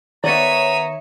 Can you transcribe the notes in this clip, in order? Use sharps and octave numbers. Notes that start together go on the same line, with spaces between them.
D#3 B3 C#5 D5 E5 A#5 D#6 C#7